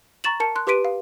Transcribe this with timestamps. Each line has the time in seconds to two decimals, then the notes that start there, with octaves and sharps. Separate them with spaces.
0.24 A#5 C#6 A6 E7 F#7
0.40 A#4 A5 C#7
0.56 C6 F#6
0.67 G4 B4 C6 B6 D7 D#7
0.85 F5